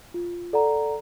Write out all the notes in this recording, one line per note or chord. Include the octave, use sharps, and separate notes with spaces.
F4
A4 D5 F#5 A#5